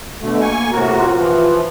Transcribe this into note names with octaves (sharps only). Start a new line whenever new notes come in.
B2 D3 A3
A#3 G#5 C#6
A2 C3 F#4 A#4
F4
E3 F3